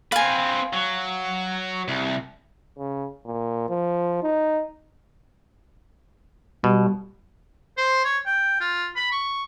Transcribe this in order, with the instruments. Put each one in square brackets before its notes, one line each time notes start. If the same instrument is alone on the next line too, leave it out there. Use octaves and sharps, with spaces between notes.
[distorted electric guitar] C4 B4 [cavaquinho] F5 G#5
[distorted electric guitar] F#3
C2
[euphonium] C#3
A#2
F3
D#4
[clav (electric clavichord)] B2 [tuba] G3
[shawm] C5
C#5
G5
F4
B5
C#6